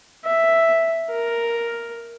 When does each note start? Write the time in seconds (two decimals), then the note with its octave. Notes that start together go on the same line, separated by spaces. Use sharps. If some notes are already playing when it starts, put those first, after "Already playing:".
0.25 E5
1.11 A#4